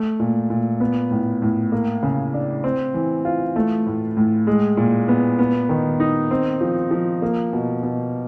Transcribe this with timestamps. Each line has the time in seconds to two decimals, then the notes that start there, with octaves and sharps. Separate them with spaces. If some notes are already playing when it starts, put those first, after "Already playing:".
Already playing: A3
0.20 A#2
0.50 A#2
0.80 B3
1.11 A2
1.42 A2
1.72 A#3
2.03 C#3
2.34 D4
2.64 C4
2.94 E3
3.25 F4
3.56 A3
3.86 A2
4.17 A2
4.47 G#3
4.77 A#2
5.08 B3
5.39 B3
5.69 D#3
6.00 D#4
6.31 C4
6.61 F3
6.91 F3
7.22 A#3
7.53 B2
7.83 B2